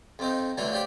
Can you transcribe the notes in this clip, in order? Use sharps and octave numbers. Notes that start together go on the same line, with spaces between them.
F2 C4 D#4
D3 E3 F#3 A3 D4
F3 D4 G4 G5